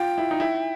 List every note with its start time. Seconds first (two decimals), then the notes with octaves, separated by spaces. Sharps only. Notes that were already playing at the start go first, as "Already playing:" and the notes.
Already playing: F4 G5
0.18 E4
0.31 D#4
0.40 E4